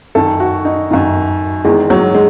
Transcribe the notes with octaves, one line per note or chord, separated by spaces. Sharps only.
F#2 D#3 A4
F#4
D#4
F#2 D#3
E2 D#3 G#3
F#3
G#3